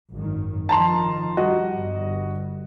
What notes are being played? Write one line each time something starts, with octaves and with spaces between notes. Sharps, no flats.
G#1 F#2 D#3
D#3 F3 A5 A#5 C6
G3 F#4 D#5
G1 G2